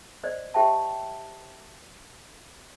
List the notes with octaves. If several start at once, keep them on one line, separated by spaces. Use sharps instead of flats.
C5 D5 D#5
G4 C5 E5 G5 A5